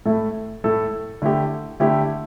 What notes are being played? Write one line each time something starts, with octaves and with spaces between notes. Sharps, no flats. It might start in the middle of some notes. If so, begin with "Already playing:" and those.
A2 A3 E4 A4
A2 A3 E4 A4
D3 A3 E4 G4
D3 A3 E4 G4